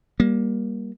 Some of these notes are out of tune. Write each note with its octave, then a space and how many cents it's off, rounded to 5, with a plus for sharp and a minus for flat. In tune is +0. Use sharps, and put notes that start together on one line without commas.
G3 +0 A#3 +20